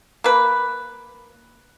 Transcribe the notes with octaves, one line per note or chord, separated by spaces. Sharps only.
A#3 B4